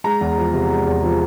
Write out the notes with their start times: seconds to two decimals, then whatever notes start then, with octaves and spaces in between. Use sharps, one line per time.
0.04 G#3 A#5
0.21 E2
0.38 F3
0.53 C3
0.70 G#3
0.86 E2
1.03 F3